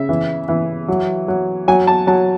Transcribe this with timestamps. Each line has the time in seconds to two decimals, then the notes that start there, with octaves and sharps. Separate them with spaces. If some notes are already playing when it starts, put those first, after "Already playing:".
Already playing: C#3 E5
0.09 E3
0.49 E3
0.88 F#3
1.28 F#3
1.68 F#3 G#5
1.87 A5
2.07 F#3 A5